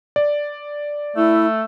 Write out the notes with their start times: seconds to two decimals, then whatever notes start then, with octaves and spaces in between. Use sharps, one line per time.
0.16 D5
1.16 A3 E4